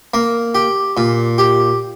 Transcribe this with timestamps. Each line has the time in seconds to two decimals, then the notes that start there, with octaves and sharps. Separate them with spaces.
0.14 A#3
0.55 G4
0.97 A#2
1.38 G4